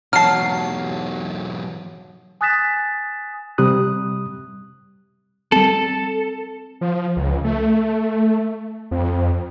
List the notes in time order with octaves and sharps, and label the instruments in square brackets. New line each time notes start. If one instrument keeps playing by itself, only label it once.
[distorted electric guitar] B1 E2 [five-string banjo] F#3 A5 [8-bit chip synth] F6 C7
[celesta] G#5 D#6 F#6 A6 B6 E7
[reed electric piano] C3 G3 D#6 F#6
[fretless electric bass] G3 C4 [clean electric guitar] A4
[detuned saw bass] F3
C#2
A3
F2